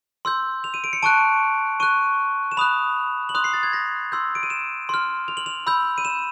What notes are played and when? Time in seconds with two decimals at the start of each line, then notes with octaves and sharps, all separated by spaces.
0.25 C6 E6 G6
0.64 F7
0.74 D#7
0.84 D7
0.93 C#7
1.03 A5 C#6 F#6 D7
1.80 C#6 F#6 D#7
2.52 E7
2.57 B5 D#6 F#6 F7
3.29 F#7
3.35 C6 D#6 F#6 F7
3.44 C7
3.53 A6
3.63 G#6
3.73 A#6
4.12 C6 E6 G6
4.35 D7
4.43 D#7
4.50 E7
4.89 C6 F6
5.28 F7
5.37 F#7
5.46 F7
5.67 B5 E6 G6
5.98 D#7
6.05 E7